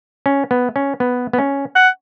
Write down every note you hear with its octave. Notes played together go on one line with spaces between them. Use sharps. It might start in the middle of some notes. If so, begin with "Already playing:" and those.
C#4
B3
C#4
B3
B3
C#4
F#5